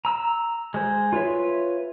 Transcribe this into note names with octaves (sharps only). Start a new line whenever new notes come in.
A#5 E6
G#3 C5
F4 B4 C#5 E5